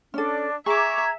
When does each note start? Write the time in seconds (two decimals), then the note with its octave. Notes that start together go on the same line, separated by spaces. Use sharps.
0.14 C#4 D4 A4
0.66 G#4 E5 A#5 C#6 D6 G#6